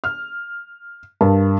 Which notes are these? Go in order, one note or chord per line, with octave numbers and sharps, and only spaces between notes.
F6
G2 A#4 A5